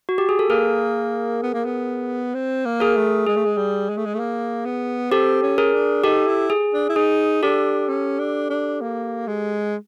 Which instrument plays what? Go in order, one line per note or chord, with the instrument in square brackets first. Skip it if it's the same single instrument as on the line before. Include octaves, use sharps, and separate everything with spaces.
[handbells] F#4
G4
G#4
A4
[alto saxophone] A#3 [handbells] G#4 A#4
[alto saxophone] B3
A#3
B3
C4
A#3
[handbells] G#4 A#4
[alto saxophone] A3
[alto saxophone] G#3 [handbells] G#4
[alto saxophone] A3
G#3
G3
G#3
A3
G#3
A3
A#3
B3
[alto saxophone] C4 [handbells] G4 A4
[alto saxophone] C#4
[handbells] G#4 A#4
[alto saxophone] D4
[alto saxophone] D#4 [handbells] G4 A4
[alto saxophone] E4
[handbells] G#4
[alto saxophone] D4
E4
[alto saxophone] D#4 [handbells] G#4
[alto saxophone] D4 [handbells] G4 A4
[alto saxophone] C#4
D4
D4
A#3
G#3